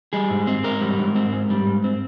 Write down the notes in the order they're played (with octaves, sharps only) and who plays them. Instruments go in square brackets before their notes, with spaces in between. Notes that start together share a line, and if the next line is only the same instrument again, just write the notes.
[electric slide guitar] G3 G#4
G#2
C4
G#2 A#4
G3
G#2
C4
G#2
G3
G#2
C4